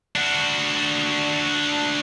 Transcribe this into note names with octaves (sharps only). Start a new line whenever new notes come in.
D4 F#4